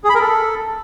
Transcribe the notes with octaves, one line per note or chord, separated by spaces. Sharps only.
G#4
B5
A#4
A4